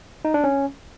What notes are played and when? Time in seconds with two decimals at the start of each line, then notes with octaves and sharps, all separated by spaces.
0.25 D#4
0.34 D4
0.44 C#4